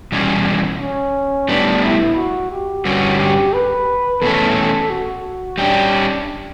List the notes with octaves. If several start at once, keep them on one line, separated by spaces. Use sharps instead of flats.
E2 B2 G3 C#4
C#4
A2 G3 B3 D4
E4
F#4
G4
G2 D3 G3 C#4 F#4
G4
B4
E2 B2 A3 C#4 A4
F#4
G3 C#4 D4 G4